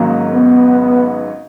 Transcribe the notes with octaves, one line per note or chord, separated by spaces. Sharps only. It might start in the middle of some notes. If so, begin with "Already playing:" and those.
Already playing: G#1 G#2 D#3 F#3 A#3 C#4
B3